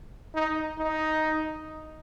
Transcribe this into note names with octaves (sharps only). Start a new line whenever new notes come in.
D#4
D#4